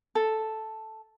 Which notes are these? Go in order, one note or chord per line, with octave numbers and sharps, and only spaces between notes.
A4